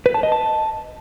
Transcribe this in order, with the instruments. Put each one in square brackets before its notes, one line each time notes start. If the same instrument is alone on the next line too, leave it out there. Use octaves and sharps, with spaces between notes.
[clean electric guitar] B4
A5
D#5
A5